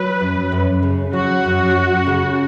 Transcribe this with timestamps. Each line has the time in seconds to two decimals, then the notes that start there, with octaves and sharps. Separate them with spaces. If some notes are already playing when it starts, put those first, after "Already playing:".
Already playing: F#3 B4
0.21 F#2
0.52 F#2
0.83 C#3
1.13 F#3 F#4
1.45 F#2
1.75 F#2
2.07 C#3